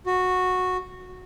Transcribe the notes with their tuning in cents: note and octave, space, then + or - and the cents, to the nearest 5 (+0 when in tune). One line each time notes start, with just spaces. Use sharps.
F#4 -10